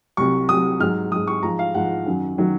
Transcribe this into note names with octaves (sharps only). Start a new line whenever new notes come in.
C2 C3 F#3 C#6
C2 C3 F#3 D#6
G#2 F#3 F6
G#2 F#3 D#6
C#6
G#2 F3 A#5
F5
G#2 F3 F#5
F#2 D#3 F#3
D#3 F#3